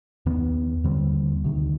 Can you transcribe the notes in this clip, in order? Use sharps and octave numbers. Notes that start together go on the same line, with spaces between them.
D#2 D#3 B3
D#2 D3 G3 C4
D2 C3 D#3